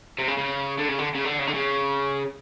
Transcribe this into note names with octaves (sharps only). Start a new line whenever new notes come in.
C3
C#3
C#3
D3
C#3
D3
C#3
D3
C#3
D3
C#3